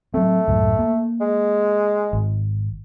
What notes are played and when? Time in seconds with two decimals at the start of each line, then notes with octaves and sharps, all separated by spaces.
0.14 F#3 A3 C4
0.48 C#2 F#2 A2
0.79 A#3
1.21 G#3
2.13 G#1